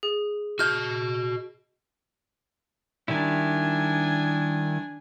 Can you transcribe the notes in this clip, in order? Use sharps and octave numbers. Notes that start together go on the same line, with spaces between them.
G#4
F#4 D#5 F6 G6
D#3 G3 D4 E4 G#5